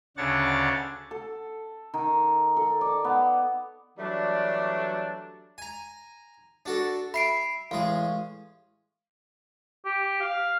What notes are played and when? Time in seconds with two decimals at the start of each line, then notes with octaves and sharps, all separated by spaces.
0.17 D2 C#3 D4 C#5 F#5 A6
1.11 A4
1.94 D#3
2.57 A4
2.81 D5
3.04 B3
3.98 E3 F#3 G3 A3 D4
5.58 G#5 A#5
6.66 D4 F#4 A4
7.14 E5 B5 C7 D7
7.71 A1 G#3 G#4 F5
9.85 G4
10.21 F5